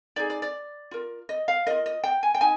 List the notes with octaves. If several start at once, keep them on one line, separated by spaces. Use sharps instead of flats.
D#4 G#4 D5
D5
D5
F4 A#4
D#5
F5
F4 A#4 D#5
D#5
G5
G#5
G5
D#4 G#5